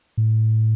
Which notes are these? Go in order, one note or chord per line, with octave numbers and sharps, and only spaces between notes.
A2